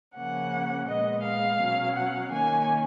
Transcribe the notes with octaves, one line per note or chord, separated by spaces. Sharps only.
C#3 F3 A#3 C#4 F#5
A#2 G#3 B3 D#5
F5
B2 F#3 C#4
F#5
D#3 A#3 C#4 G#5